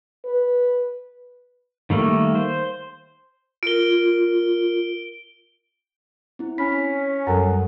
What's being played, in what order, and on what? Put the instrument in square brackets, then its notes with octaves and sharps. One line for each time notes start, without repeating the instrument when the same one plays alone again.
[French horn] B4
[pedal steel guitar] D#3 G3 A3 A#3
C5
[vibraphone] F4 A#4 [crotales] D7 G7
[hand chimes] C4 E4
[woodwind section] C#4 [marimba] B5 [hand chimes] B6
[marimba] F#2 F#3 G3 [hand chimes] A4 A#4 F#5